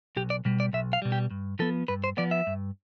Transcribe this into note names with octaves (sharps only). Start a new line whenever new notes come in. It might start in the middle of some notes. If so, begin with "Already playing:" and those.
B1 G4
D5
B2 G3
D5
B1 E5
F5
B2 G3
G4
G2
F3 B3 A4
G2 B4
C5
F3 B3 D5
E5
G2